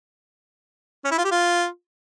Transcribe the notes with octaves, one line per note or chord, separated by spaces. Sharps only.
C#4
E4
F4
G4
F4